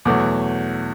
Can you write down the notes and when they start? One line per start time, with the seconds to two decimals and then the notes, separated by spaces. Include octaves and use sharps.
0.05 E2 B2 F#3 A3 D6